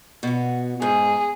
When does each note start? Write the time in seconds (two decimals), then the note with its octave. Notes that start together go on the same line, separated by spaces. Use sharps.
0.23 B2 F#4
0.82 G#2 G#4